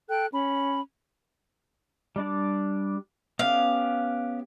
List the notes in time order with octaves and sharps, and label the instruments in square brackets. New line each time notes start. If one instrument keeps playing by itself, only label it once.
[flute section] A4 G5 F#6
C#4 B5
[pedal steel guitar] G3 D4 D5
[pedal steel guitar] B3 C#4 G4 [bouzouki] F5